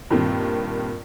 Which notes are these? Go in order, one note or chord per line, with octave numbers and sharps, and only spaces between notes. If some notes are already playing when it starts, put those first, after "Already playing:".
G2 A#2 D#3 C4